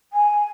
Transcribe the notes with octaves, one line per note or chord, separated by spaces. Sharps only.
G#5